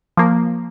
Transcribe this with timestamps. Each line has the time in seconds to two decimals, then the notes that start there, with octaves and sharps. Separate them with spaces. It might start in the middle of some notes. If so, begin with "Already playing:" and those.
0.17 F3 A#3